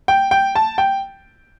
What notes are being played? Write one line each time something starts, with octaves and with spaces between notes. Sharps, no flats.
G5
G5
A5
G5